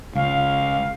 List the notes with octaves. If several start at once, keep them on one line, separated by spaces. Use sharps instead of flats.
C#2 F5